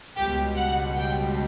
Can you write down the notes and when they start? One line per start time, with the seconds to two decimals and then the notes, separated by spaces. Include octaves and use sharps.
0.16 C#2 B2 G3 G4
0.56 F#5
0.95 G5